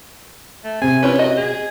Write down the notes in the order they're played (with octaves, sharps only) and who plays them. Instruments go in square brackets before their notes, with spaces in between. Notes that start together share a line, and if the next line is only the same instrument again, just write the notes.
[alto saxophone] A3
[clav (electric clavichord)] C3 C4 [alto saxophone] G#5
[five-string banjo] C#4 E4 F4 [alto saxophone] B4
[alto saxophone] F#4 [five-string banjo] D#5
[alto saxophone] G#4